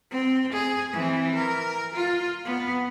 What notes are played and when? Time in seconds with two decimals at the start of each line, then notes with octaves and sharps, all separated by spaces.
0.11 C4
0.53 G#4
0.93 E3 C4
1.35 A#4
1.95 F4
2.45 B3